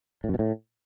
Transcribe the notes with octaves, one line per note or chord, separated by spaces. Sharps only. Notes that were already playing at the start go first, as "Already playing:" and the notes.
A2
F#2
B2
A2